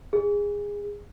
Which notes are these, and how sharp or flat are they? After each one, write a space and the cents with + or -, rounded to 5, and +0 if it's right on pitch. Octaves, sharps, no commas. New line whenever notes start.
G#4 -20